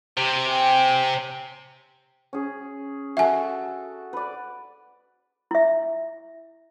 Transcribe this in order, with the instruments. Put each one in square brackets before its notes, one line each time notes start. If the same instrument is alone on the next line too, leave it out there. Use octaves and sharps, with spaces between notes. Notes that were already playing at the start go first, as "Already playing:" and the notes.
[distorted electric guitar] C3 [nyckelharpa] G4
[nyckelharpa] G5 G#5
[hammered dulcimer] C#4 G#4
[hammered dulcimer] F#4 A4 [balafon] E5 G#5
[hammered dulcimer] B4 D5
[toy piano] E4 E5